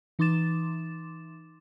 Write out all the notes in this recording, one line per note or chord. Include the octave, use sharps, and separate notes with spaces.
E3 D#4 C6 D6 A6 E7